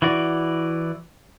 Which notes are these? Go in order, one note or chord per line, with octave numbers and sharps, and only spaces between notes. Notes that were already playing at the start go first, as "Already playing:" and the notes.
E3 E4 F#4 D5